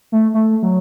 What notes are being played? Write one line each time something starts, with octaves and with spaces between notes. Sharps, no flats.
A3
A3
F#3